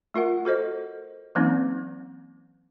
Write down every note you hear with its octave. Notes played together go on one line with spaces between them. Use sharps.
A3 F4 A#4 F#5
F#4 A4 C5 D#5
E3 F#3 A#3 C4 C#4 D#4